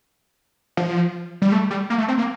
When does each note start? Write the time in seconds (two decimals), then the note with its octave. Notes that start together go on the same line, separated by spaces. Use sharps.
0.77 F3
1.42 G3
1.52 A3
1.70 G3
1.90 A#3
1.98 A3
2.08 C4
2.18 A#3